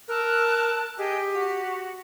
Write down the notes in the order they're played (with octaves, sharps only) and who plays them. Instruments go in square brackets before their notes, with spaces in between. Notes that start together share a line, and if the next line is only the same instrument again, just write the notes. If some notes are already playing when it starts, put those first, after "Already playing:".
[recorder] A#4 [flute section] A5 E6 F#6
[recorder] G4 [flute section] G#4 D#5 G5
[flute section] F#4